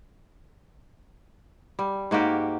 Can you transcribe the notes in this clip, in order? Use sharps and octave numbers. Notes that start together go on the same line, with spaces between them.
G3
G#2 A#3 F#4 G4